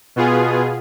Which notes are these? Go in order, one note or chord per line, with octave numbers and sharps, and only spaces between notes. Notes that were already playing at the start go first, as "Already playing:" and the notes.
B2 B3 F4 G#4